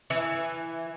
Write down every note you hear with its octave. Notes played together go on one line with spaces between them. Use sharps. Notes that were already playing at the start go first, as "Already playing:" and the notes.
E3